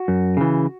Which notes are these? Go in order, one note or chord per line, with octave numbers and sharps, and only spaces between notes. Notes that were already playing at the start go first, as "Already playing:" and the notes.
Already playing: F#4
F#2
C#3 E3